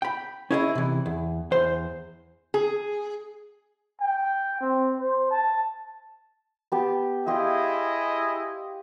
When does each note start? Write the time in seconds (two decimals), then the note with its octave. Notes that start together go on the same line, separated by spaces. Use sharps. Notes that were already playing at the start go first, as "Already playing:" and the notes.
0.02 G5 B5
0.50 C#4 D#4 E4 G#4 C#5 D#5
0.75 C3 E3
1.06 E2
1.52 E2 C5 C6
2.54 G#4
4.01 G5
4.61 C4
4.99 C5
5.30 A5
6.72 B3 G4 A5
7.27 E4 G4 G#4 C5 D#5 F5